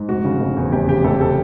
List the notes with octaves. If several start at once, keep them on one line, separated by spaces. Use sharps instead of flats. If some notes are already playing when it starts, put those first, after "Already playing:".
Already playing: G#2
F1 F#4
C#3
F1
E2
F1 G4
C#3 G4
F1 A4
A4